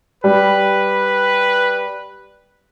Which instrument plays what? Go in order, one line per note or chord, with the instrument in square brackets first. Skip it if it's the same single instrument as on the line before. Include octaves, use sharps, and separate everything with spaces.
[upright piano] G3 [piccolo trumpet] B4